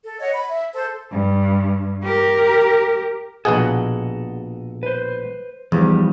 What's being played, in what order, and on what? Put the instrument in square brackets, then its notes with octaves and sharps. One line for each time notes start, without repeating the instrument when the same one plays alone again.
[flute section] A4
C#5 D#5 F#5
B5
E5
A4 C5
[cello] G2
G4 A#4
[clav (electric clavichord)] A#1 B2 G#4 [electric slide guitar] A4 D#5 F#5
[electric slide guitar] B4 C5
[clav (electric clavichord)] E2 [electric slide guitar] F3 G3 D#4